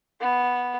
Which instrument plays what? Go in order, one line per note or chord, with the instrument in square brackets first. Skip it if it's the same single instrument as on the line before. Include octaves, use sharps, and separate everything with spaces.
[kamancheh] B3